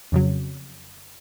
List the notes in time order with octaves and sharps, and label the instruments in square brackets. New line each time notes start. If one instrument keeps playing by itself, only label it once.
[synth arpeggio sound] F2 C#3 F#3